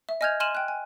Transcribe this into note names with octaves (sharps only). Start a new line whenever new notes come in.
E5
D#5 G#5 F6 G6 G#6 F7
G#5 C6 F6 D#7 E7 F#7
G5 F#6
G#5